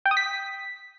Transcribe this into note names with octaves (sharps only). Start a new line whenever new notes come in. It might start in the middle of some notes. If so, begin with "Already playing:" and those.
G5
D#6
B6